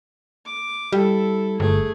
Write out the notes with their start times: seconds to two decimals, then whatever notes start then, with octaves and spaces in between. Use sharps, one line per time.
0.46 D6
0.93 G3 E4 A4
1.60 G1 A3 G#4